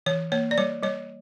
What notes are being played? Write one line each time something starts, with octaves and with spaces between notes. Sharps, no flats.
E3 C#5
A#3 C#5
D5
G3 C#5
G3 C#5